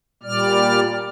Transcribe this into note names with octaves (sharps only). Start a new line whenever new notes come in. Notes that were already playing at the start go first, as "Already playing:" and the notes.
A#2 G3 D5 F6